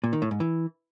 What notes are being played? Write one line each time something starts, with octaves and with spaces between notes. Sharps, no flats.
A#2
D#3
A2
G#2
E3